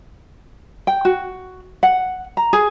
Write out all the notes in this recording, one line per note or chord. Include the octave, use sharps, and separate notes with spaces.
G5
F#4
F#5
A#5
G#4